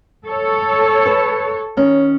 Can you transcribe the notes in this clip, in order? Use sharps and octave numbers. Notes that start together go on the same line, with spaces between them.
A4 C#5
B4 A5
D#3 C#4